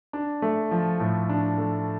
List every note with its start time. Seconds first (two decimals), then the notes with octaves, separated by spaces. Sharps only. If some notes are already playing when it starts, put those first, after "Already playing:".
0.13 D4
0.42 A3
0.71 F3
1.00 A2
1.29 D4
1.58 A3